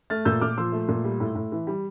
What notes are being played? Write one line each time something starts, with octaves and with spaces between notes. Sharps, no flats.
A3 F6 A6
A#2 E6 G6
A#2 D6 F6
F3 C6 E6
A3
A#2
G3
A2
A2
E3
G3